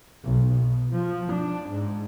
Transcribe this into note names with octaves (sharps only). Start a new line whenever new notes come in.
B1
B2
F3
D4
G#2